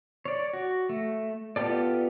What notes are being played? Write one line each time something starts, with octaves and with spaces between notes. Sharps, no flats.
C#5 D5
F#4
A3
B3 F4 G4 A4 D5